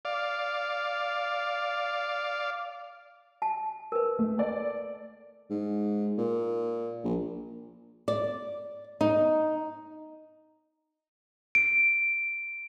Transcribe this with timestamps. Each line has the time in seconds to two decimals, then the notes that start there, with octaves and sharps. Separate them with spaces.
0.05 D5 F5
3.42 A5
3.92 A#4 B4
4.19 A3
4.38 A4 D5
5.50 G#2
6.18 A#2
7.04 A#1
8.08 D5
9.01 D#4
11.55 D7